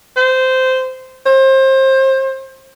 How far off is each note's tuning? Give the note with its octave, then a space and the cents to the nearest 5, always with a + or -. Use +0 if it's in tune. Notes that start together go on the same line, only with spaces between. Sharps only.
C5 -15
C5 +30